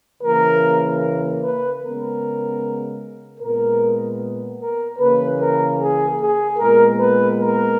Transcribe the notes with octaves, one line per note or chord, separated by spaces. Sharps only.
C#3 E3 A#3 A#4
B4
C#3 G#3 B3 A#4
A#2 G#3 B3 A#4
A#4
C#3 E3 A#3 B4
A#4
G#4
G#4
A#2 G#3 B3 A#4
B4
A#4